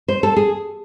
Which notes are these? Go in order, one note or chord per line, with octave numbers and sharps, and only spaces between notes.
C5
A4
G#4